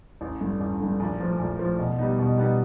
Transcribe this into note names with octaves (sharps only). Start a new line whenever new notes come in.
A1
G2 D3
A1
G2 D3
A#1
A2 F3
A#1
A2 F3
B2
G3 B3 D#4
B2
G3 B3 D#4